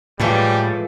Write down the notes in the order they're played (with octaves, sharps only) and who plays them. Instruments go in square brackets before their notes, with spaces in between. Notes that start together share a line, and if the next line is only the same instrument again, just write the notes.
[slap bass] A2 [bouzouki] E3 G#3 A4 [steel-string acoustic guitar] F3 F4 [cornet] G3